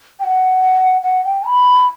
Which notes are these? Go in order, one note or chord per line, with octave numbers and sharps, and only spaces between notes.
G5
F#5
F#5
G5
B5